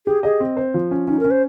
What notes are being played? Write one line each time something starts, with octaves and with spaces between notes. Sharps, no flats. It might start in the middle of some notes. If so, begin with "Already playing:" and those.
G4 G#4
G#4 D#5
C4
C5
F3
C#4
C#4 D#4
C#4 A#4
C5